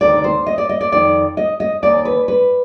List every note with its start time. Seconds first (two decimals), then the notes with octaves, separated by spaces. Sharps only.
0.01 D2 C3 D#3 D5
0.24 C5
0.46 D#5
0.58 D5
0.69 D#5
0.81 D5
0.92 F2 D#3 D5
1.37 D#5
1.60 D#5
1.82 D#2 D#3 D5
2.05 B4
2.28 B4